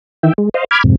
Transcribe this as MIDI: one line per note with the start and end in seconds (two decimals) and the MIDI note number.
0.23 0.33 51
0.23 0.33 52
0.23 0.33 76
0.23 0.33 79
0.38 0.49 56
0.54 0.64 72
0.54 0.64 75
0.54 0.64 77
0.71 0.83 83
0.71 0.83 86
0.71 0.83 89
0.71 0.83 92
0.84 0.95 41
0.84 0.95 44
0.84 0.95 48